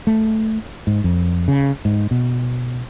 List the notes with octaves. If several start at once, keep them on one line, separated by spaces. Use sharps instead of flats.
A3
G#2
F2
C#3
G#2
B2